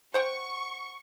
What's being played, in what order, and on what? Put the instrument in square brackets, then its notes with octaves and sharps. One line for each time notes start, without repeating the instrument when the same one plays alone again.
[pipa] C5 F#5 G5 [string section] C#6